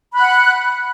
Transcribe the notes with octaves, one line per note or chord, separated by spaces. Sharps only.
F#5 B5 F#6